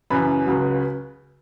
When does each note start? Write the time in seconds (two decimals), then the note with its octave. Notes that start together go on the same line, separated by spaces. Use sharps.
0.10 F#2 C#3 E3 B4 B5
0.46 C#2 C#3 F#3